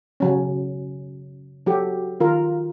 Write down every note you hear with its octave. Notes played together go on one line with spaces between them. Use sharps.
C#3 F#3 C#4
F#3 F#4 G4 A4
D#3 F4 A#4